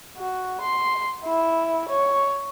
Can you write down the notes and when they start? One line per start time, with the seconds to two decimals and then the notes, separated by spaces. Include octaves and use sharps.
0.17 F#4
0.62 C6
1.25 E4
1.89 C#5